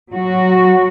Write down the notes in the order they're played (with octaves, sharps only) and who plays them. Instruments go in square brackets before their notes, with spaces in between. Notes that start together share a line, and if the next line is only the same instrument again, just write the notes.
[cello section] F#3 F#4